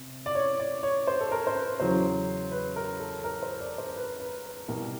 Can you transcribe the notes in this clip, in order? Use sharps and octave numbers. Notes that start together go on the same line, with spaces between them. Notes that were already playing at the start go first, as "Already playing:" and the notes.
Already playing: C3
D5
C#5
D5
C#5
C5
A4
A#4
C5
B4
E2 C#3 F#3 C5
B4
A#4
A4
A#4
C5
D5
C5
B4
B4
B4
C2 B2 G3 A#4